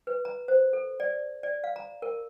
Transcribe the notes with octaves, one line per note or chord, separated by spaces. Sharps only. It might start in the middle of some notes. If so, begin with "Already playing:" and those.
B4
A#5
C5
A4
D5
D5
F5
A#5
A#4